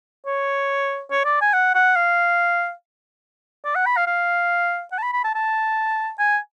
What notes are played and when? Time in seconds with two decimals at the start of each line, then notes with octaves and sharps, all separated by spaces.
0.26 C#5
1.11 C#5
1.25 D5
1.42 G#5
1.54 F#5
1.75 F#5
1.96 F5
3.65 D5
3.75 F#5
3.86 B5
3.97 F5
4.07 F5
4.92 F#5
4.99 A5
5.03 B5
5.13 B5
5.24 A5
5.35 A5
6.19 G#5